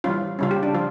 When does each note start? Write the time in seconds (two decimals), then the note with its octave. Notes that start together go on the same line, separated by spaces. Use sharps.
0.04 E3 G3 C#4 F4
0.39 C#3 G3 C#4 F4
0.51 G4
0.63 D4
0.74 F3 F4